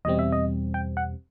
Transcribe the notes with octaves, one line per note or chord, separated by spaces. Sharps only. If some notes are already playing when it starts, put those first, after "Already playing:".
E2 B2 G3 C4 D#5
E5
D#5
G5
F#5